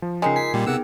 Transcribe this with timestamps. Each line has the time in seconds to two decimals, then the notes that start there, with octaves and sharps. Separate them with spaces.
0.02 F3
0.22 C#3 G#3 D#4 F4 A#4 G5 C7 C#7
0.36 A#4 G#5 B6 C7
0.54 A#2 G3 G5
0.66 C3 B3 D#4 G#4 F#5 E6